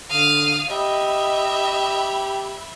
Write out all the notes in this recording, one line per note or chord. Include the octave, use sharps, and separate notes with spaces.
D3 F5 D#6
G4 D#5 E5 B5